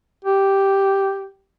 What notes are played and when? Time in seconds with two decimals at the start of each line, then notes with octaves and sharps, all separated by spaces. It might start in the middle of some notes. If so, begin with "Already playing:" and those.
0.25 G4